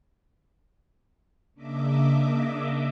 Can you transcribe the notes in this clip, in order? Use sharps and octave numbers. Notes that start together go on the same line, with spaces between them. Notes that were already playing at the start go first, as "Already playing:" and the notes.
C#3 A#3 D4 D#5 E5 D6